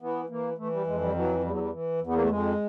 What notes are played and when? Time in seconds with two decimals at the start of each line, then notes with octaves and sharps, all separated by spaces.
0.01 E3 B3
0.29 E3 A#3
0.58 E3 A3
0.72 G3
0.87 F2 G#3
1.01 G3
1.15 E3 F#3
1.43 E2 G3
1.51 F#3
1.60 G3
1.72 E3
2.01 E2
2.07 B3
2.14 A#3
2.22 A3
2.29 F2 G#3